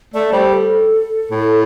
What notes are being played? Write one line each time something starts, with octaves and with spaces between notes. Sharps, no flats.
A3 D5
G3 C5
A4
A2